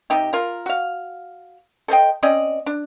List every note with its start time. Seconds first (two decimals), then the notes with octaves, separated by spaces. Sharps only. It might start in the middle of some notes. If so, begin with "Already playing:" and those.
0.10 C3 D#4 G4
0.33 F4 A#4
0.66 F#4 F5
1.88 A4 C5 D#5 G5
2.23 C4 C#4 D5 D#5
2.66 D4